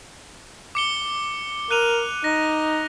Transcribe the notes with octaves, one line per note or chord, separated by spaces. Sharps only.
D6 C#7 G7
A#4 F#6 D#7 F7
D#4 A#6